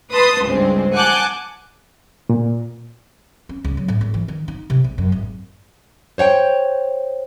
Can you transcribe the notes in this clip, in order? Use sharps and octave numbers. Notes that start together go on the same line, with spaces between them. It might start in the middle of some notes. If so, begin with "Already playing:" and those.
B4 A5 C6 D#6
C#2 G2 G#3 C4
F#5 G#5 A5 D6 F#6 G6
A#2
C#4
C#2
F#3
A2
G#1
E3
D#3
D#4
C3
A#1
F#2
G#1
C5 C#5 F#5 G5